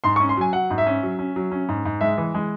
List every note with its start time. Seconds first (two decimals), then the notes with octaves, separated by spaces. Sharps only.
0.04 G#2 C6
0.16 C#6
0.20 C#4
0.29 C6
0.37 F#3 G#5
0.53 F#3 F#5
0.70 G#2
0.78 E5
0.87 C#4
1.03 F#3
1.19 C#4
1.36 F#3
1.52 C#4
1.69 G#2
1.85 G#2
2.01 G#3 E5
2.18 E3
2.34 G#3